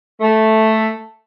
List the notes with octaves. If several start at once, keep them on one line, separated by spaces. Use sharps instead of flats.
A3